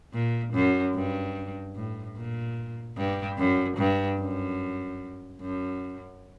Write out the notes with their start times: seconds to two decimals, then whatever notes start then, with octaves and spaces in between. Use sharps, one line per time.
0.13 A#2
0.54 F#2
0.94 G2
1.75 A2
2.16 A#2
2.97 G2
3.38 F#2
3.78 G2
4.19 F#2
5.41 F#2